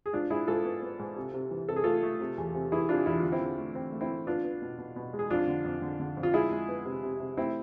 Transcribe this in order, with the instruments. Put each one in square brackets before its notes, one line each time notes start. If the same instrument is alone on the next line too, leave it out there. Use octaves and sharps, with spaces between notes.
[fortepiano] G#4
G#2 D4 F4
G#2 E4 G#4
G#2 F4 A4
B3
B3
G#2
C3
C3
E3
C3 A4
G#4
A3 F4 A4
A3
C3
E2
C3
E3 E4 G#4
C3 D4 F4
E2 E4
D3 F4
C4 E4
D3
A3
C4
A3
C4 E4
A3
B3 D4 F4
B3
B2
B2
B2
G#3
G#4
F2 D4 F4
D3
F2
D3
D3
F2
F4
G#3 E4 G#4
G#3
B3
C3
C3
C3
A3 C4 E4